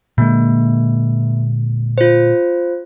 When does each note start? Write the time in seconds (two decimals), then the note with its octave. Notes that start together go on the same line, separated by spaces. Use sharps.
0.18 A#2 D3 G#3 A#3
1.98 F4 C5